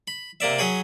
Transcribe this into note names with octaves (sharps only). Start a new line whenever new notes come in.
B5
C3 A#3 D5 E5
F#3 G#4 C#5 B5